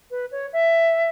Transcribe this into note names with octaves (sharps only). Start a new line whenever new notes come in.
B4
C#5
E5